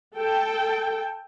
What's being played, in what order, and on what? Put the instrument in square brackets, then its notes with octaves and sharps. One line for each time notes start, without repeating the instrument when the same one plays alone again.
[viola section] A4 G5